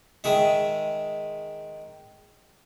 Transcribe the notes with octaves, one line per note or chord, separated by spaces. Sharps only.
D#3 G#3 E5